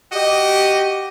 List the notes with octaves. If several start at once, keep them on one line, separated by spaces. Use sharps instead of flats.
F#4 G4 D#5